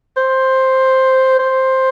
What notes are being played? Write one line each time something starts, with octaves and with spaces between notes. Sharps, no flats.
C5
C5